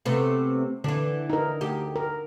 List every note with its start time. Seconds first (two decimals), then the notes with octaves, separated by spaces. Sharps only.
0.06 C3 A3 B3
0.84 D3 E3 D4
1.30 D#4 A#4
1.61 D2 G4
1.96 A#4